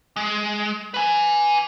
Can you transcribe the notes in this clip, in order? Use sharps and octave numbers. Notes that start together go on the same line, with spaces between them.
G#3
B4 G#5